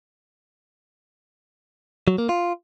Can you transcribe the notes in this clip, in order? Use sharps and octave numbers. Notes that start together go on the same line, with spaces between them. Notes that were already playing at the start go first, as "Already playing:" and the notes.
F#3
A#3
F4